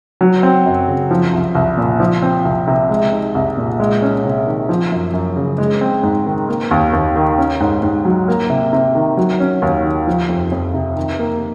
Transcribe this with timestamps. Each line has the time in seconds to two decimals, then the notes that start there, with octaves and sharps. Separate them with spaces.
0.21 F#3
0.43 C4
0.66 F#2
0.88 C#3
1.11 F3
1.33 C2
1.55 C2
1.77 A#2
2.00 F3
2.22 C4
2.45 C2
2.67 C3
2.90 G#3
3.13 D#4
3.35 C2
3.57 A#2
3.80 G#3
4.02 C#4
4.24 C3
4.47 D#3
4.69 F3
4.92 F#2
5.14 F#2
5.36 C#3
5.58 G#3
5.81 C4
6.03 G#2
6.26 D#3
6.48 A#3
6.71 D#2
6.93 D#2
7.16 D#3
7.38 C#4
7.60 G#2
7.83 G#2
8.05 F#3
8.28 A#3
8.50 C3
8.73 C3
8.95 D#3
9.17 F#3
9.40 C#4
9.62 D#2
9.84 D#3
10.07 F3
10.29 F2
10.52 F2
10.74 C3
10.97 D#3
11.19 A#3